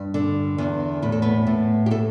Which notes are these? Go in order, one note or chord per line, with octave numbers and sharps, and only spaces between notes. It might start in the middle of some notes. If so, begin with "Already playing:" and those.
Already playing: G2
D3
E2
A2 B4
A4
B3 B4
A2
G4
A3 A4